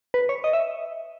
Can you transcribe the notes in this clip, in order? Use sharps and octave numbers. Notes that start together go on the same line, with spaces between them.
B4
C#5
D#5
E5